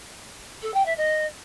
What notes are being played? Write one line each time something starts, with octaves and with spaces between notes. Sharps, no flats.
A4
G5
E5
D#5